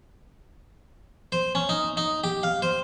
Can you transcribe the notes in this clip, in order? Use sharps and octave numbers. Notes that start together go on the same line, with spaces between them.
C5
C#4
D#4
D#4
G4
F5
C5